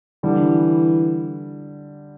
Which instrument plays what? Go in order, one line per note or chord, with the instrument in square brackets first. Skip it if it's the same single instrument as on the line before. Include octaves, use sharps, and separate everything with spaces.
[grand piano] D3 G3 [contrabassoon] E3